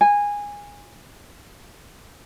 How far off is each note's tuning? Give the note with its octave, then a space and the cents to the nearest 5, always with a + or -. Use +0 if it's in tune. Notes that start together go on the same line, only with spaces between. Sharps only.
G#5 -15